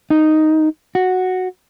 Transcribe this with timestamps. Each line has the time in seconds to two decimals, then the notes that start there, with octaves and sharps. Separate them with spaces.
0.10 D#4
0.95 F#4